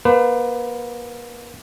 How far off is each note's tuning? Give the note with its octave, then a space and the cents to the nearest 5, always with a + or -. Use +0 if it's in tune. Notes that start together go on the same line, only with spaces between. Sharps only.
A#3 +40 B4 +30